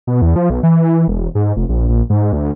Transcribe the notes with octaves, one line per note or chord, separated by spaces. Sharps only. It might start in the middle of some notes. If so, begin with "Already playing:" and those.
B2
E2
F3
B1
E3
E1
G#2
F1
A#1
A#1
G#2
D2